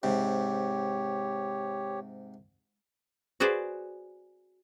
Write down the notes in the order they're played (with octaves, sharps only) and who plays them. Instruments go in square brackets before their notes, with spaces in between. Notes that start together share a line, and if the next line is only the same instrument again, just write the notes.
[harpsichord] G#2 C3 [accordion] G4 C#5
[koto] F#4 G#4 B4 C5 D5